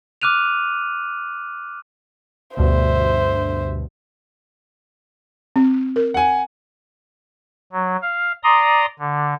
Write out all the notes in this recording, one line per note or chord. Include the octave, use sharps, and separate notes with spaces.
D6 F6 F#6 D#7 F7
D2 G2 B2 C5 E5
C4
A#4
F#5 G#5
F#3
F5
D5 A#5 C6 D#6
D3